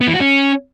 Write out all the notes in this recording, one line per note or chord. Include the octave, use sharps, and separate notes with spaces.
B3
E3
F#4
C#4